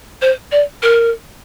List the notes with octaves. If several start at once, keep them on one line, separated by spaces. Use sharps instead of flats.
C5
D5
A#4